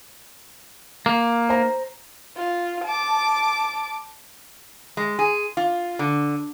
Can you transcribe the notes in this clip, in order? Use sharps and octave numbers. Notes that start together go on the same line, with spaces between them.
A#3
C5 A#5
F4
A5 D6
G#3
G#4
F4
D3